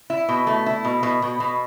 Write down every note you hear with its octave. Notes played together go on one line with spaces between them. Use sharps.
E4
B2
A3
E4
B2
B2
B2
B2